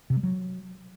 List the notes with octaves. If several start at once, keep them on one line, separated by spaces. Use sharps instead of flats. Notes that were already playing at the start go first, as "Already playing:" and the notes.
C3
G3
F#3